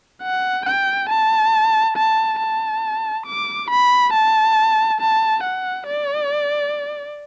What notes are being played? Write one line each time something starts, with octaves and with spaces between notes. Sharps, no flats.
F#5
G5
A5
A5
A5
D6
B5
A5
A5
F#5
D5